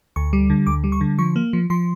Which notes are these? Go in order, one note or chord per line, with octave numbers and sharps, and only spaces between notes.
D2 C#6
G3
D3
D2 D6
G3
C#6
D3
F3 C#6
A#3
F3
F3 C6